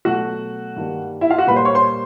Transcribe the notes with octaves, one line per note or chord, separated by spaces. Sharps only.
B2 F#3 A3 F#4 F#5
G2 D#3 G3 A#3
E4 E5
F4 F5
F#4 F#5
A#2 G3 A#3 B4 B5
C5 C6
C#5 C#6
C5 C6